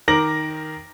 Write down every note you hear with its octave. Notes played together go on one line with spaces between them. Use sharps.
D#3 A#4 D6 A#6 F#7